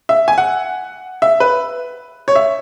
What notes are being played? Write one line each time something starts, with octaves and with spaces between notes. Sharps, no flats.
E5
G#5
F#5
E5
B4
C#5
E5